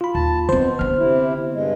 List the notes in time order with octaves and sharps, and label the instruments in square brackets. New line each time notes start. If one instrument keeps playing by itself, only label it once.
[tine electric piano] F4 B5
[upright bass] D#2 [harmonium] A5
[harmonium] B2 [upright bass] D#3 C4 [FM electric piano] C5
[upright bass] D3 B3 [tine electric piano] F6
[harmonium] C3 E4
G2 G#3